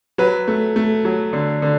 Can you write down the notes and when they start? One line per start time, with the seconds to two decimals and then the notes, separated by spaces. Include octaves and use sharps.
0.18 F#3 B4
0.48 A3
0.76 A3
1.05 F#3
1.33 D3
1.62 D3